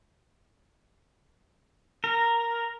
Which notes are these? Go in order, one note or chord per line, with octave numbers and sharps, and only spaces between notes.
A#4